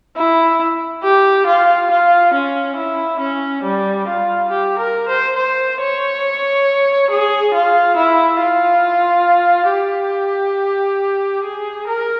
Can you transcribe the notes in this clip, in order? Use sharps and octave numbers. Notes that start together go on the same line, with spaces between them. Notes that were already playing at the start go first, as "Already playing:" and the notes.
E4
G4
F4
F4
C#4
E4
C#4
G3
F4
G4
A#4
C5
C5
C#5
G#4
F4
E4
F4
G4
G#4
A#4